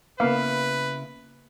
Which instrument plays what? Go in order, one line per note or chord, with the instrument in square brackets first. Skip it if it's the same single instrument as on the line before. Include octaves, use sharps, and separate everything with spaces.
[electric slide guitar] C#3 E4 [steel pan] A#3 B3 F5 [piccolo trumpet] B4